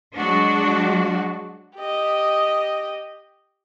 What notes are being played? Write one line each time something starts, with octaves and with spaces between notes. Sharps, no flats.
F#3 G#3 D4 F#4
G4 D#5